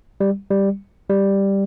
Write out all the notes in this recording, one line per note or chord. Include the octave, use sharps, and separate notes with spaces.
G3
G3
G3